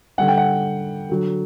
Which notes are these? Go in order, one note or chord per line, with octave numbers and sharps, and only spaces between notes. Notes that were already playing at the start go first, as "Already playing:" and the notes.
D3 G3 F#5
G5
F#5
D3 F#3